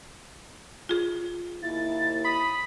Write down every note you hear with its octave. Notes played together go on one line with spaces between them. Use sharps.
F4 G#4
D#2 E4 A6
B5 D#6